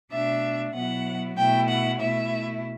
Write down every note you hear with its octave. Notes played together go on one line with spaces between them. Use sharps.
B2 A3 D4 E5
B2 F#3 B3 E4 F#5
B2 A3 E4 G5
F#5
B2 A3 E4 E5